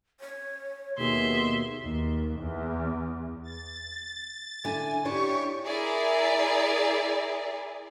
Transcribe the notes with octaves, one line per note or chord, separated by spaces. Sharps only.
C#5
D#2 B2 G#4 E5 C6
D#2
E2
A6
D3 E4 G#5
D4 E4 G4 C#5 C#6
E4 G#4 A#4 D5